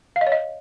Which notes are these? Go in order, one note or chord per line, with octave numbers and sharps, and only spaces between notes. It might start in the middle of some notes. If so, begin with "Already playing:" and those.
F5
D#5
C#5
D#5